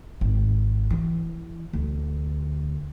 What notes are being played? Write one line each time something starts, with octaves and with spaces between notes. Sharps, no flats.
G#1
E3
D2